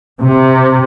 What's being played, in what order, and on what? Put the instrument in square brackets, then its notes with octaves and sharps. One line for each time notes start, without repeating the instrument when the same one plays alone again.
[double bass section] C3